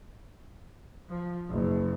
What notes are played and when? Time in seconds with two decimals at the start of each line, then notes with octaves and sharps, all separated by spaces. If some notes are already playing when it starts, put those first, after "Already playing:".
1.09 F3
1.50 F#1